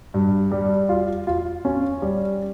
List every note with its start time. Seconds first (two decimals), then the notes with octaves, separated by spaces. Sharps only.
0.14 G2
0.52 G3
0.89 F4
1.27 F4
1.65 C#4
2.02 G3